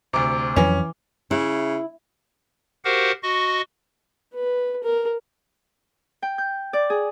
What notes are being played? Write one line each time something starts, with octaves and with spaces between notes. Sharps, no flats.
D2 C3 D6
F2 E3 F#3 C#4
C#3 E4
F#4 G4 A#4 C5 F5 F#5
F#4 D#5 C#6
B4
A#4
G5
G6
D5
G#4